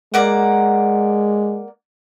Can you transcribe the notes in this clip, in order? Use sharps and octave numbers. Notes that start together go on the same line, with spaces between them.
G#3 A#3 D5 F#5